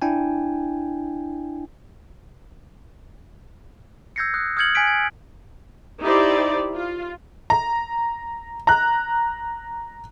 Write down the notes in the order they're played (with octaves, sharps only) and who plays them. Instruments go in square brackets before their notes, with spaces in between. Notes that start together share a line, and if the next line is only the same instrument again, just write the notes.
[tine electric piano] D4 E4 G5 G#5
[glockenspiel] E6 G6 G#6 A#6 C7 C#7
D#6 F#6
D#6 F6 G6 G#6 C#7 F#7
G#5 F#6 G#6 B6 D7
G#6
[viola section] D#4 E4 G4 C5 D5
F4
[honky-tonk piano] A#5
A#5 F#6